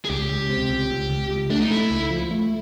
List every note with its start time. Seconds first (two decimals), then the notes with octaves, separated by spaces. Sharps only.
0.05 G#4
0.10 C#2 G4
0.30 C#2
0.49 C3
0.69 C#2
0.91 C#2
1.10 C#2
1.30 C#2
1.50 A3 D4
1.60 D#4
1.71 A3 E4
1.91 C#2
2.10 F3
2.31 A3